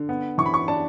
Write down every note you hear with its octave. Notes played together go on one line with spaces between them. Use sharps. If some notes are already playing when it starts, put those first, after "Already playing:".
Already playing: D3
B3
E3 C#6
B5
C#6
D4 A5